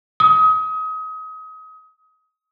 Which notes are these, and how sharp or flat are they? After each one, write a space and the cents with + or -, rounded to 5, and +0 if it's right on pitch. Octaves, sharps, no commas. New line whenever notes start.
D#6 +30